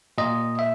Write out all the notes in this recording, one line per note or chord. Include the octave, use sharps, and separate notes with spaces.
A#2 D#5
E5